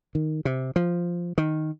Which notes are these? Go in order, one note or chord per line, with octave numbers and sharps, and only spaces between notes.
D#3
C3
F3
D#3